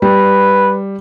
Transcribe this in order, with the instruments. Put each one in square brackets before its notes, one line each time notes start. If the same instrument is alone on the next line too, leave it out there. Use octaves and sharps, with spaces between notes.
[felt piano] G3 [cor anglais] B4